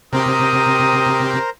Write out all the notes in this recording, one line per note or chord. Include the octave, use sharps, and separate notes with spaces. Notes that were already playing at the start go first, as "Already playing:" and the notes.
C3 C4 G4 A#4 C5 A#5 D#6